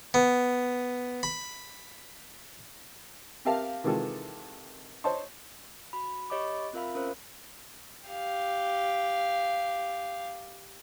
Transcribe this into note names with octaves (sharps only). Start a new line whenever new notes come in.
B3
B5
C4 G4 A#4 E5 F5 A5
C3 D#3 E3 G#3 F4 A4
C5 C#5 D#5 A5 C6
F#4 B5
G4 C#5 D#5 B5 D6
C4 F4 A#4 E5 F5 B5
C#4 A#4 C5
G4 F5